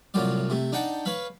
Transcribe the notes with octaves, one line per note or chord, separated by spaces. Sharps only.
C2 A2 F#3 F4 D5
C3 A3
D4 D#4 F#5 G5 A5
B4 C#5 F5 B5